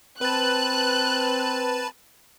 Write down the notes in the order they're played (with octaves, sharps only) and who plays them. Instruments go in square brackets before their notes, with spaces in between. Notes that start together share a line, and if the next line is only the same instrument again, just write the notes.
[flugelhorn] C4 [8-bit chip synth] B4 A5 [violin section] F#6